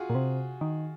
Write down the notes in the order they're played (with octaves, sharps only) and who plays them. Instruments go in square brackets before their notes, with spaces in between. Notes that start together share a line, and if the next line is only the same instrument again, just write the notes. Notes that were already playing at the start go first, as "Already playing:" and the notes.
Already playing: [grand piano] F4 F#4 G#4
[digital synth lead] A#2
C3
D#3